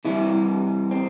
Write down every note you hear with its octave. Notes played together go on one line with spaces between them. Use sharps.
C3 E3 G3 E4
C4